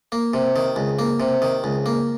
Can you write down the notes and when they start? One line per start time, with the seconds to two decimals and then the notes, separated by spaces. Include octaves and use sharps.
0.12 A#3
0.34 C3
0.56 D#3
0.76 C#2
0.99 A#3
1.20 C3
1.42 D#3
1.64 C#2
1.86 A#3